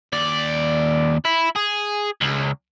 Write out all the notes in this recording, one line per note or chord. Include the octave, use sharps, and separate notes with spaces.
D#2 D5
E4
G#4
C#2